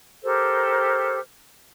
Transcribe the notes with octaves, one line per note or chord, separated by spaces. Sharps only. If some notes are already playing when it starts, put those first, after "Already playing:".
G4 A4 A#4 C5